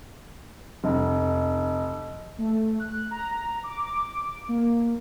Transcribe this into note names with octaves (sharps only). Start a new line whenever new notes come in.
F1
A3
F#6
A#5
D6
A#3